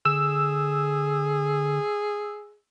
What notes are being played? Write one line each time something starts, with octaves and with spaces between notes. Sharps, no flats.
D3 G#4 E6